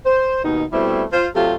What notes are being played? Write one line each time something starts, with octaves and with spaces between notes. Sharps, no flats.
C5
D#2 B2 D#3 D#4
B2 G3 A3 C4 E4
F4 C5
C3 F#3 A3 F4 G4 A4